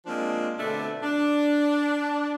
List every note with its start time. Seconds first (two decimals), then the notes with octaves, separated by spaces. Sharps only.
0.06 F3 G#3 A#3 C4 D4
0.58 B2 D3 A3 C4 D4
1.03 D4